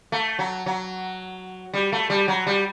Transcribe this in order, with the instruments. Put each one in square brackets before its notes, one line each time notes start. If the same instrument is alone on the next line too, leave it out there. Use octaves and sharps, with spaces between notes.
[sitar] A3
F#3
F#3
G3
A3
G3
F#3
G3